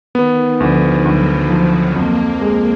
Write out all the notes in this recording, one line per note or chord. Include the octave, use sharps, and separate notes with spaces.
D#3 B3
D2 F3
D2 F#3
F3 F#3
F2 A#3
G#3